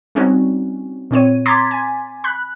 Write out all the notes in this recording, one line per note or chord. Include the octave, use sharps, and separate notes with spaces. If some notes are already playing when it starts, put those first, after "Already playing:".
G3 C4 C#4 D#4 F#4
A#2 C4 C#5 D#7
A#5 C6 D6 G#6 A6 B6
G#5
B5 F#6